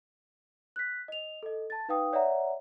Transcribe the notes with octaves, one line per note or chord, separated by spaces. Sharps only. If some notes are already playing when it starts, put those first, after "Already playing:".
F#6 B6
D#5 F7
A4 D#5
A5 A6
D#4 B4 F5 G5 D#6
C#5 D5 E5 F#5 A#5